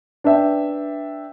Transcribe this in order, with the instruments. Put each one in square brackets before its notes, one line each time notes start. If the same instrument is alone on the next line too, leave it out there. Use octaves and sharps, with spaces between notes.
[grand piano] D4 B4 E5 G5